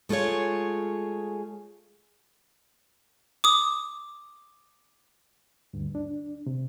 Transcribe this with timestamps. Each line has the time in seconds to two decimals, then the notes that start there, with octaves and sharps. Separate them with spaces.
0.09 G#3 A3 F4 G#4 C#5
3.44 D6 D#6
5.74 D2 G2
5.95 D4
6.46 C3